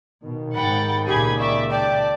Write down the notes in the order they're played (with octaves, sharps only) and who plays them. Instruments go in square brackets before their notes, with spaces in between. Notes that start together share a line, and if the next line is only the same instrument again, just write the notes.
[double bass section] B2 [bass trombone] D#3
[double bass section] G#2 [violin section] F#5 G5 A6 [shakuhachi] B5
[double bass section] C#2 A#2 [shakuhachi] G4 [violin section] G#4 B5 G#6
[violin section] D5 E5 [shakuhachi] C#6
[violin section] D5 A5 [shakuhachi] G5